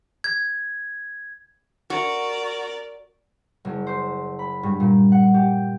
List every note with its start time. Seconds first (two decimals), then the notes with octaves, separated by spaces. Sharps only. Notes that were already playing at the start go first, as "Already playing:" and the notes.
0.24 G#6
1.90 F#4 A#4 D5
3.65 F#1
3.87 C5
4.39 B5
4.63 G2
4.80 A#2
5.12 F#5
5.34 G4